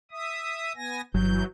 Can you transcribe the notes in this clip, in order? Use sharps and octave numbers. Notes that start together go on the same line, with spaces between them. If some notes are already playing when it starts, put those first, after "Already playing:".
E5 D#6
B3 G#5 A#6
G1 E3 F#3 G6